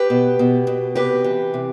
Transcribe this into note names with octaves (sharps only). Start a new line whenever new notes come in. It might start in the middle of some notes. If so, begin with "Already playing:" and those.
Already playing: G4 B4
B2
B2
B2
C3 G4 B4
E3
C3